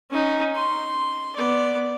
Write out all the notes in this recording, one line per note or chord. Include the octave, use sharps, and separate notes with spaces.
C#4 D#4
C6
B3 D5